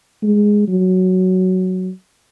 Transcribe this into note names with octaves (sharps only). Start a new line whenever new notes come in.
G#3
F#3